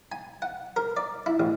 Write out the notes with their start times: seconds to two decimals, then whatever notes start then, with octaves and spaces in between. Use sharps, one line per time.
0.12 G#5
0.42 F#5
0.76 A#4
0.97 D5
1.26 E4
1.40 A1